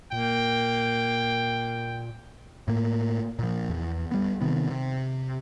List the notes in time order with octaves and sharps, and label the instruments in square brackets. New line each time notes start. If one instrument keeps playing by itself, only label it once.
[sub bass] A#2 [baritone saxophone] A#3 [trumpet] G5
[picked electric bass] A2 A#3
A#2 F3
E2
G3 B3
C3 D#3 B3
C3